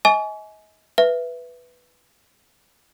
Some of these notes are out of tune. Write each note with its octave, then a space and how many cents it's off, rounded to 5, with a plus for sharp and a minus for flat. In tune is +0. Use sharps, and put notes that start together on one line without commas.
D#5 +35 G#5 +25 C#6 +40
B4 +0 E5 +10